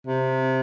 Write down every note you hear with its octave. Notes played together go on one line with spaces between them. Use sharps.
C3